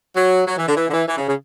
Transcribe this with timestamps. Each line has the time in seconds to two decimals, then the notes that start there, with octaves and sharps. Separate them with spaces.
0.16 F#3
0.47 F#3
0.58 E3
0.67 D3
0.77 E3
0.88 D3
0.92 E3
1.07 E3
1.18 C#3
1.28 C#3